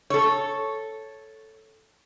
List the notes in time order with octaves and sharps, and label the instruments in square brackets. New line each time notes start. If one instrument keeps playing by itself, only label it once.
[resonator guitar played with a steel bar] A4 C#5